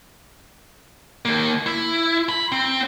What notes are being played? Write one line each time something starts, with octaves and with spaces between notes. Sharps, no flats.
D#2 A#3
E4
B5
C4